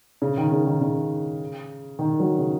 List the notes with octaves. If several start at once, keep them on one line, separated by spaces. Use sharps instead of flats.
C#3
D#3
C#3
D#3
C#3
D#3
F#3
C#3